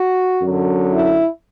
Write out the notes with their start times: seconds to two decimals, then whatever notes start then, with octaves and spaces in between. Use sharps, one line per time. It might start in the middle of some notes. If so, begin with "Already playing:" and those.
Already playing: F#4
0.42 F#2 D3 F#3
0.92 E4